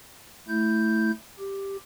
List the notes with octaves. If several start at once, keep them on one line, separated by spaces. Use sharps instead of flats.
A3 E4 G6
G4